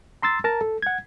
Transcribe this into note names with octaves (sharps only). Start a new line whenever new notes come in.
A#5 C6 E6 A6
A#4 A5 A#5
A4
F#5 G#6